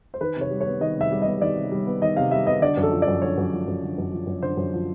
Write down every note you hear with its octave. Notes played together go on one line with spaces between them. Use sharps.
C5
D#3 B4
C3 C#5
G3
C#5
B3
D#3 D#5
C3 E5
G3
B3 D#5
D#3 D5
C3
G3
B3
D#3 D#5
C3 F5
G3 E5
B3 D#5
D3 D5
F#2
A4
F3
D5
F#2
D3 C#5
F#2
F3
F#2
D3
F#2
F3
F#2
D3 C5
F#2
F3